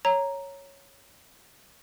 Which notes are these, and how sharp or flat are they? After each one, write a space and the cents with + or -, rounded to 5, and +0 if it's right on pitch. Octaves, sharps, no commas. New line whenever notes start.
C#5 +0 A#5 +0